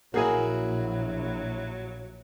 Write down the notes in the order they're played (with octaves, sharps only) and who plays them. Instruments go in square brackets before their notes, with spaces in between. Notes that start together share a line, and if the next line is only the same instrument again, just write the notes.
[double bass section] A#1 [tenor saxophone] F#3 [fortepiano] A#3 G#4 G#5 [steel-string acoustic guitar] E4 F#4